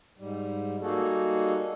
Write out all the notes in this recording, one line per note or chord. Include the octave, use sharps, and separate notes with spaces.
G#2 G3
G3 A#3 D#4 F#4 G#4 A4